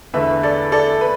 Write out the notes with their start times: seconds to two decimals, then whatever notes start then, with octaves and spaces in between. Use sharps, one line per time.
0.13 E2 D3 A3 B4 E5
0.43 A4 D5
0.72 A4 D5
1.01 B4